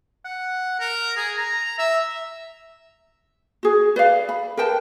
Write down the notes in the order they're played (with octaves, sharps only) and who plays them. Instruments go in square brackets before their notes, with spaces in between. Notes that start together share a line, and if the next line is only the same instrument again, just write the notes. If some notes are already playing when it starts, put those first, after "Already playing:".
[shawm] F#5
A#4
G#4
A#5
E5
[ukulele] F#4 G#4
B4 D5 F5
B5
A#4 B4 G5 A5